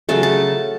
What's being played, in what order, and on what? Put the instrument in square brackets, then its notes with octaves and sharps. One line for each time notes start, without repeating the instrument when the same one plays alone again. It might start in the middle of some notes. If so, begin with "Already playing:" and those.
[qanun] C#3 F#3 A3 A5
A5